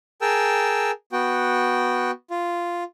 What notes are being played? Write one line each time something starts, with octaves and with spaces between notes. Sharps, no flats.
G#4 A#4 G5 A5 E6
B3 F#4 G5
F4